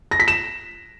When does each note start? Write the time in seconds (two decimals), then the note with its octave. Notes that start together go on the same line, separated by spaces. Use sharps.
0.11 A#6
0.20 B6
0.28 E7